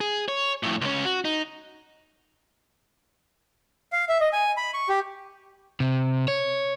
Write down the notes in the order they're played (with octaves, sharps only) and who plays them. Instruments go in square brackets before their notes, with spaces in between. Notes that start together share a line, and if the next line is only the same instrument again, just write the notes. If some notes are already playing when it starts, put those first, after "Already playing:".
[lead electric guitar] G#4
C#5
F2 A2
C#2 C#4
F#4
D#4
[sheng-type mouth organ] F5
E5
D#5
G#5
B5
C#6
G4
[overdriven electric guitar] C3
C#5